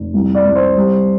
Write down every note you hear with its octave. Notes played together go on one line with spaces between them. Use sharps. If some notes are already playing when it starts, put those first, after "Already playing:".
Already playing: F1
C2
D5
C2
C5
G3